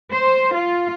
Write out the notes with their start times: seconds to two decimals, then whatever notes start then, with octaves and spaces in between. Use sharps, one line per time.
0.13 C5
0.55 F4